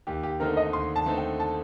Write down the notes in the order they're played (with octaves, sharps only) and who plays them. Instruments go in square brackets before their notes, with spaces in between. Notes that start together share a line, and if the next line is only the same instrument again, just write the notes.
[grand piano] D#2 [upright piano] G4
[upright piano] G4
[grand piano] D3 A3 C4 D#4 [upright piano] A#4
[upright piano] D#5
[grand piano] D#2 [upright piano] C6
[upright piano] A5
[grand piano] D3 A3 C4 D#4
[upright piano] G5
A5